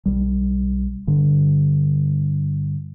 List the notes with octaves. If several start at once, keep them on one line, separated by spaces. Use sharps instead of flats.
B1 G3
G2 D3